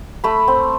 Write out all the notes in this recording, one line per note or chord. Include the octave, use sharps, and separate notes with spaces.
A3 B5
C4